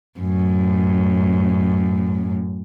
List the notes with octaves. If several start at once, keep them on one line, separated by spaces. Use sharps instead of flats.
F#2 A2